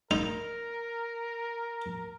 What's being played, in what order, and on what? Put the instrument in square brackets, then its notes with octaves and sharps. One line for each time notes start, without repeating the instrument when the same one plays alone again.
[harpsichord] D#4 [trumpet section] A#4